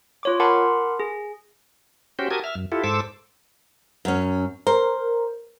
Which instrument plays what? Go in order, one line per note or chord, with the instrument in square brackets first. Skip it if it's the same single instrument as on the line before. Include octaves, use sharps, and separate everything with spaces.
[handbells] F4 C#5 D6
A#4 F#5 A5 B5 C6 D6
G#4
[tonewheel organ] C#4 F#4 G4 C5 G5
F#4 G4 A#4 A5 D#6 G#6
E5 F6
F#2
E4 F4 G4 A4
G#2 A4 C5 D6 E6
[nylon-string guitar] F#2 C#4
[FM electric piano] A#4 [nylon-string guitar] C5